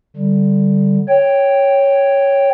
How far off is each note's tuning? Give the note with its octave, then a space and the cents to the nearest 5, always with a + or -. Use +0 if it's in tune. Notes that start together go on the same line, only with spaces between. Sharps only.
D3 +0 G3 -5
C#5 +0 G5 +0